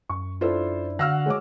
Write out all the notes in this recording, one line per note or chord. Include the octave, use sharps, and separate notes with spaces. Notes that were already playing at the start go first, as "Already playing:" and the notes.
F#2 C#6
D4 E4 F4 A4 C5 D5
D3 F#4 F5 F#5 E6 F6 A#6
G#3 C#5 D6